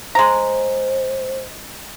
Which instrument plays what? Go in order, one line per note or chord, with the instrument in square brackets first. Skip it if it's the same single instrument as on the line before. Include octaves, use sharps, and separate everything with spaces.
[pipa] G#3 A#5 [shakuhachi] C5